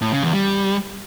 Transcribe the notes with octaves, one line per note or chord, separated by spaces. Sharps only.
A2
C#3
E2
G3